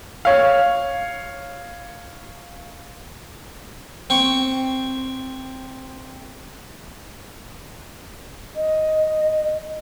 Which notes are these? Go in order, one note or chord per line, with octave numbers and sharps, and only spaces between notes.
C#5 F5
C4 C#6
D#5